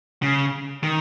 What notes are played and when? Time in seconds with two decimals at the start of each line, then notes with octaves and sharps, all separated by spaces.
0.22 C#3
0.83 D#3